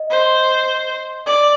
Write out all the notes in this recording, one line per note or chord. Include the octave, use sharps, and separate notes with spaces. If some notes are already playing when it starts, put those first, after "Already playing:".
Already playing: D#5
C5
D5